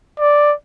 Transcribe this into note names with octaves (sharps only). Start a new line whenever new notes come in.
D5